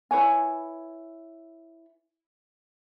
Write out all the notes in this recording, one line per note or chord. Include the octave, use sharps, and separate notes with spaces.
E4 B4 C#5 G#5